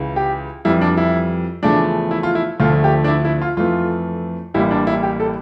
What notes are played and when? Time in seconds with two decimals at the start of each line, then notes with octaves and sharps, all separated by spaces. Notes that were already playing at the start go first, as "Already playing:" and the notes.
Already playing: C#2 C#3 E3
0.16 G4
0.65 F2 E3 G3 E4
0.81 D4
0.97 E4
1.63 E2 C#3 F3 A3 D4
2.11 E4
2.23 F4
2.35 E4
2.60 D2 D3 F3 A3 F4
2.84 G4
3.04 D4
3.08 E4
3.25 E4
3.42 F4
3.57 F2 E3 A3 F4
4.54 A1 A2 G3 A#3 E4
4.71 D4
4.87 E4
5.03 G4
5.20 A4